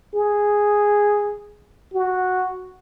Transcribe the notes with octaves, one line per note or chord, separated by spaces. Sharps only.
G#4
F#4